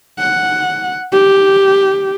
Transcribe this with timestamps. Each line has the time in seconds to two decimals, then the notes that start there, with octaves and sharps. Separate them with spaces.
0.19 F#5
1.12 G4